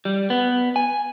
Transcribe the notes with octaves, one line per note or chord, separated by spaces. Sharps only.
G3
B3
G#5